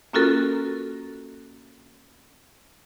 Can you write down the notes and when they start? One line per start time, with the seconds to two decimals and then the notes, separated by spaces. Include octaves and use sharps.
0.13 A#3 C#4 F4 F#4 A4 A#4